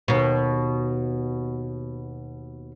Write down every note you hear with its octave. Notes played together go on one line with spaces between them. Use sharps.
D#2 B2